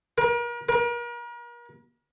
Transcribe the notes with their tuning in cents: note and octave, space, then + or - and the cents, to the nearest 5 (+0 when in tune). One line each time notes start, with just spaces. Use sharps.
A#4 +40
A#4 +40